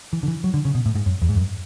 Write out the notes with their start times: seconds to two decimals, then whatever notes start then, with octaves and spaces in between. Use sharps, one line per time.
0.13 E3
0.23 D3
0.28 E3
0.44 F#3
0.54 D3
0.65 C#3
0.75 B2
0.86 A2
0.95 G#2
1.06 F#2
1.22 E2
1.29 G#2
1.37 F#2